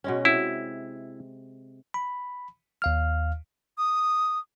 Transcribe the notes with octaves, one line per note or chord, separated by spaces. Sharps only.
B2 G#3 C#4
C3 E4
B5
D#2 F5 F6
D#6